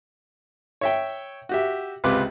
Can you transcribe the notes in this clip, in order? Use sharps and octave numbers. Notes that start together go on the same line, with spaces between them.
C#5 E5 G5
F#4 G4 E5
C#2 C3 F4 B4 D6